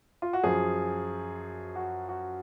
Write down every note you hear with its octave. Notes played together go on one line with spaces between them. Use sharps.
F4
F#4
F#2 F3 G#4
F#4
F#4